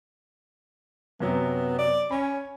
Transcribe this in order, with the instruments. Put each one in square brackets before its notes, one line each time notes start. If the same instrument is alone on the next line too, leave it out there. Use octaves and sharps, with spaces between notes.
[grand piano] F#2 C3 F#3 [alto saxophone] B3
[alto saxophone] D5
[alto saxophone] C#4 [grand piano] C#5 B5